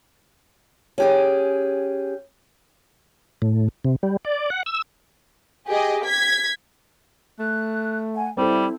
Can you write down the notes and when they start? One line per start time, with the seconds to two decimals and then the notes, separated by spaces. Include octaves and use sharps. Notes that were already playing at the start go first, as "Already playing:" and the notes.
0.98 C#4 G4 G#4
3.42 A2
3.85 C3
4.03 G3
4.25 D5
4.50 F#5
4.66 E6
5.68 G4 G#4 D#5
6.07 G#6 B6
7.39 A3 F#6
8.15 F#5 G#5
8.37 G3 C4 E4 A4